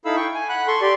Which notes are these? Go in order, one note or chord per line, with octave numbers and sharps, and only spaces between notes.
D#4 E4 A4 F5 B5 E6
G5 C#6
G#5
F#5 B5 F#6
A4 C6 C#6
G4 D5 C6